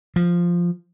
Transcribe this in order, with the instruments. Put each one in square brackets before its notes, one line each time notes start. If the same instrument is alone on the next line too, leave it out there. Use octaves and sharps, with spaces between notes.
[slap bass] F3